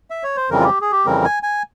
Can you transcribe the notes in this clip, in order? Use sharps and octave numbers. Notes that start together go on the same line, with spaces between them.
E5
C#5
C5
F2 C#3 E3 G3 C4 A#4
F4
G4
G#4
G4
F2 C#3 E3 G3 C4 A#4
G#5
G#5